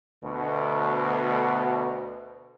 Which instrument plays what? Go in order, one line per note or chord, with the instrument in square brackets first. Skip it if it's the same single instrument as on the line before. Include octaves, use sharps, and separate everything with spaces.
[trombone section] D2 B2